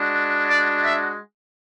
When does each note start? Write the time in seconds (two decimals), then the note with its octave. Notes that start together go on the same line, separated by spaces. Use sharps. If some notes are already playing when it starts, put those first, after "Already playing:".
Already playing: G#3 D4 F#4
0.48 D5
0.84 E5